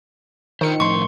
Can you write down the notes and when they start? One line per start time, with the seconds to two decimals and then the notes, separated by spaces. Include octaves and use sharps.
0.61 D#3 F4 A#4 C5 C#7
0.80 A2 F3 C6 C#6